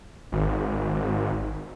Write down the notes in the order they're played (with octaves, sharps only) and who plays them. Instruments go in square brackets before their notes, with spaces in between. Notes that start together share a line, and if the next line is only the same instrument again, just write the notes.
[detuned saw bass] G#1